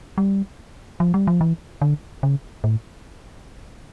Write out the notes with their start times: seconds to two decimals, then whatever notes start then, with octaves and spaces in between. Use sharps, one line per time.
0.18 G3
1.00 F3
1.14 G3
1.27 F3
1.41 E3
1.82 D3
2.23 C#3
2.64 A2